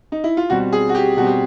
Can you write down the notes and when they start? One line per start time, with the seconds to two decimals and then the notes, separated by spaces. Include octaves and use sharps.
0.12 D#4
0.24 E4
0.37 F4
0.50 B2 G3 C4 F#4
0.73 G#4
0.89 F#4
0.95 G4
1.17 B2 G3 C4 F#4
1.27 G4